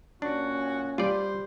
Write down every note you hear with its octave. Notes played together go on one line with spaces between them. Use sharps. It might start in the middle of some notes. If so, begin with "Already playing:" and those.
A#2 C#4 D4 F#4
G3 F4 C5 D5